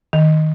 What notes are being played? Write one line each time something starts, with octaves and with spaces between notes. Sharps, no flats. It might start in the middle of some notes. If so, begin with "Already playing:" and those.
D#3